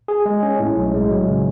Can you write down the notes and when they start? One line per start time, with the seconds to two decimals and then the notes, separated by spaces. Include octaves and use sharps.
0.08 G#4
0.26 G#3
0.43 C#4
0.60 A2
0.76 B1
0.94 G#3
1.11 F#3
1.27 C#3